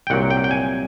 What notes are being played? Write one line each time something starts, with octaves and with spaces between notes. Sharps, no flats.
G5
C2 A#2 F#3 F#5
G5
G5
G#5